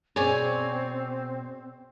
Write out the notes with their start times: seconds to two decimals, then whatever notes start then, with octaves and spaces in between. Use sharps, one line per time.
0.16 B2 C4 C#4 G#4 C#5 D5 G#5